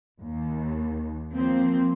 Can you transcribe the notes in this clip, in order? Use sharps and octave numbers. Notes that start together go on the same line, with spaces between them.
D#2
F3 A#3 C4